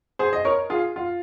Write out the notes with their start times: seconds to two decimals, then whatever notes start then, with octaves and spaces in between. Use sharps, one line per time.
0.19 G#4 C5
0.33 D#5
0.45 A#4 C#5
0.70 F4 G#4
0.96 F4